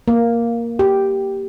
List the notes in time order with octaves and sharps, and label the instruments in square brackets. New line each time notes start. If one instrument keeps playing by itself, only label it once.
[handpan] A#3
G4